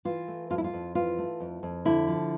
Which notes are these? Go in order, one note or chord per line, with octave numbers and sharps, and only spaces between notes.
E3 F4
A3
F2 F4
E4
F4
F2
E3 F4
A3
F2
F2
D3 E4
F3